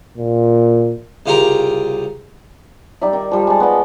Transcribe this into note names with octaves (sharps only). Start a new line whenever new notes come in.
A#2
C2 C#3 F4 G4 A#4 A#5
G3 D#4 D5 E5
D#3
F3 G3
G#3 A5
B3 D5 D#5